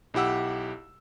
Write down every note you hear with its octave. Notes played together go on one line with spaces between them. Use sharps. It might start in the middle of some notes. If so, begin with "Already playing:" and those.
B1 E4 G4 F#5 E6